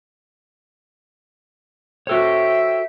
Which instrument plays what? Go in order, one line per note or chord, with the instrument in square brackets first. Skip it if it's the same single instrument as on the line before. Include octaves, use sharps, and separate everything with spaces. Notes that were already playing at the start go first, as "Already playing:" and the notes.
[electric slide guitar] F#4 A4 C#5 [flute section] C5 E5 G5